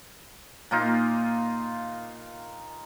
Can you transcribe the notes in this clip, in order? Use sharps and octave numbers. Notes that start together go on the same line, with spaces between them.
A#2 A#3 D#4 F4